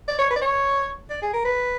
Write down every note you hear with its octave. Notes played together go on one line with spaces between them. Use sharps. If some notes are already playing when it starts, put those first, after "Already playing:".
D5
C#5
B4
D5
C#5
D5
G#4
A#4
B4